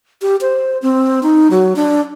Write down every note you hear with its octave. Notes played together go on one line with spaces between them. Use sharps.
G4
C5
C4
D#4
F#3
D4